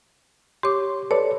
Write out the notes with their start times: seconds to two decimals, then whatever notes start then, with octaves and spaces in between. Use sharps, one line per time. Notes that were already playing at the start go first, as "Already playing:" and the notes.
0.63 G4 C#5 C6 D6
1.11 A4 B4 C#5 D5